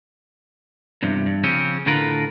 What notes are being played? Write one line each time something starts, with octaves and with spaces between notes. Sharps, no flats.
E2 G2 C3
G2
C#3 F3 C4 C#4
A2 D3 A3 F4 A#4 B4